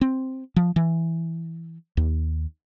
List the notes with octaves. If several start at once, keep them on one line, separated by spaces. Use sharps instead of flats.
C4
F3
E3
D#2